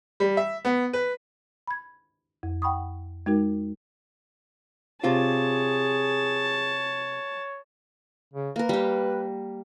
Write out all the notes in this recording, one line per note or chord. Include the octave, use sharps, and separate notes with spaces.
G3
E5
B3
B4
B5 G#6
F2
F#5 G5 B5 C#6 D#6
G#3 D#4 F#4 A#4
C3 F4 G#4 C#5 A5
C#3
A#3 A#4 B4
G3 G4